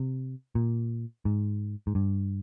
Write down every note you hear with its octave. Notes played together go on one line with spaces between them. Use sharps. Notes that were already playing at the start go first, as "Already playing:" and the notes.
Already playing: C3
A#2
G#2
G#2
G2